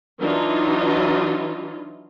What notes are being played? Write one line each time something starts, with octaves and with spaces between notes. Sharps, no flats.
E3 F#3 D4 D#4 F4